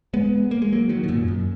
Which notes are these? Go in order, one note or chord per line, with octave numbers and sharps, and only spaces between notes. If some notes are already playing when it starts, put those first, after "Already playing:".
G#3 B3
A#3
G#3
F#3 A#3
D#3 F#3
B2
F#2 A#2
F#2